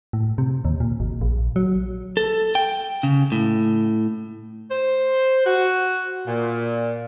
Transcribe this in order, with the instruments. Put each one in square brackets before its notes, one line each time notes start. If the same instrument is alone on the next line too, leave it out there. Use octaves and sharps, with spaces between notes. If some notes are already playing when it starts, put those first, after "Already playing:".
[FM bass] A2
C3
D#2
A#2
G#1
A#1
F#3
[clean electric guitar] A4
G5
C#3
A2
[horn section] C5
F#4
A#2